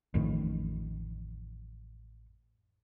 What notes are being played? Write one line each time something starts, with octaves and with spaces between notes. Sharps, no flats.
A1 F2 A2 D#3